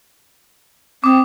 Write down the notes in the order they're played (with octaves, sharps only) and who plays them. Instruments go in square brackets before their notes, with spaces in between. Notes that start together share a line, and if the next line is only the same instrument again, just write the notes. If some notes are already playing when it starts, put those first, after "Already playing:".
[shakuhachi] C4 [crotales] D6 D#6